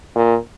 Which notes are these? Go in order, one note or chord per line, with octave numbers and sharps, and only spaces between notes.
A#2